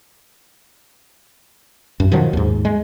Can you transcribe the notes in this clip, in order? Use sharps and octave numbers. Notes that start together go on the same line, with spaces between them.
F#2
B2 D#3 F3 F#3
D#2 G#2
G#3